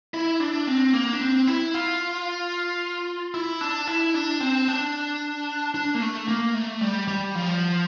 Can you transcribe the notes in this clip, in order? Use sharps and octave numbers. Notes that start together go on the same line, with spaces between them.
E4
D4
C4
A#3
D4
C4
E4
F4
E4
D4
E4
D4
C4
D4
D4
A#3
A3
A#3
A3
G3
G3
F3